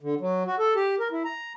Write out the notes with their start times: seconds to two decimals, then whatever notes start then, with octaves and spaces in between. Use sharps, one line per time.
0.01 D3
0.20 F#3
0.47 F#4
0.59 A4
0.76 G4
1.00 A#4
1.11 E4
1.25 A#5